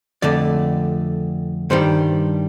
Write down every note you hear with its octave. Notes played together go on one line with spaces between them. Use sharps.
F2 D3 A3 D5
G2 D#3 G3 C5